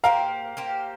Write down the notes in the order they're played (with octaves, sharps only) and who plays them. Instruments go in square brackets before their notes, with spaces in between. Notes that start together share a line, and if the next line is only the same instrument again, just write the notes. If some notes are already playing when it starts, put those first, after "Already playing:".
[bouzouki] A#3 G4 C5 [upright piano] F5 A#5
[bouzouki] A#3 G4 C5